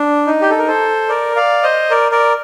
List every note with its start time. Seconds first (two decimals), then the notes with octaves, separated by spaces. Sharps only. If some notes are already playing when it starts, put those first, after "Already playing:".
Already playing: D4
0.27 D#4
0.41 G4
0.50 A4
0.59 A#4
0.68 A4 C5
1.09 A#4 D5
1.36 D5 F5
1.63 C5 D#5
1.90 A#4 D5
2.11 A#4 D5